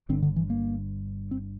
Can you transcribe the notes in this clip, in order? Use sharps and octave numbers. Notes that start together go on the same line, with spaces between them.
G1 G2 D3 C4
D3
E3
A#3
C4